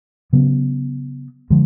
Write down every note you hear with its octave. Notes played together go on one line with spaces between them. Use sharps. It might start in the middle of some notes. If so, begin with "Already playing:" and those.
C#3 F#3 B3
D3 F3 G#3